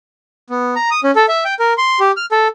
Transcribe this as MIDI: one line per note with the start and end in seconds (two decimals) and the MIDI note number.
0.50 0.75 59
0.76 0.90 82
0.91 1.00 87
1.04 1.11 61
1.15 1.26 69
1.29 1.44 76
1.45 1.54 79
1.59 1.73 70
1.78 1.99 84
2.00 2.12 67
2.17 2.26 89
2.31 2.48 69